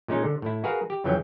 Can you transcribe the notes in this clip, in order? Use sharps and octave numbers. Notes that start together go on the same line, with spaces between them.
A#2 G#3 C#4 D#4
D3
A2 E4
F#4 G#4 A#4 B4 F5
G4
F2 C#3 E3 F#3 C#4 G5